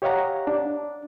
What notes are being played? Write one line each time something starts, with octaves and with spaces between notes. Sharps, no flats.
G4 C#5 D#5 F5 F#5 A#5
D4